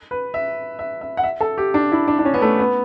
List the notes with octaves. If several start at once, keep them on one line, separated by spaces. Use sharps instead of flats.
B4
E5
E5
E5
F#5
E5
A4
G4
D4
E4
D4
D4
C#4
B3
A3
B3